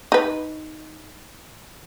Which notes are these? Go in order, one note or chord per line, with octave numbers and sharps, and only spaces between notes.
D#4 B4